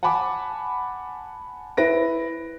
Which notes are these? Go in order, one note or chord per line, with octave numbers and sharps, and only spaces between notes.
F#5 G#5 A5 B5 D6
E4 B4 A#6 D7